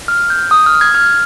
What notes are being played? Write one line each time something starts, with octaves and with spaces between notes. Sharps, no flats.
F6
G6
D#6
F6
G#6
F6